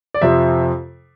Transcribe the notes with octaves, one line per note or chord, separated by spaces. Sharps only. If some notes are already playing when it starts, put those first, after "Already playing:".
D5
F2 C3 F3 E5